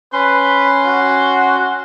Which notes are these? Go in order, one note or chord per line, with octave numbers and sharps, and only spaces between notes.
C#4 B4 C6
F#4